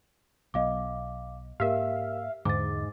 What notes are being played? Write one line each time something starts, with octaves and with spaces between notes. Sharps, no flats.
B1 F#3 B3 D#5 F5 D6
G#2 A#3 G4 A#4 E5 F5
E2 G#2 D3 D6 A6